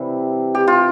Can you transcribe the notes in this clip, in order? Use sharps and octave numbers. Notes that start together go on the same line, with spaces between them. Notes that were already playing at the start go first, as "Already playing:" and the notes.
Already playing: C3 E3 G3
G4
F4